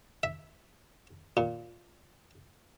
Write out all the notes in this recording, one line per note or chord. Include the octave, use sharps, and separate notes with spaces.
E5
A#2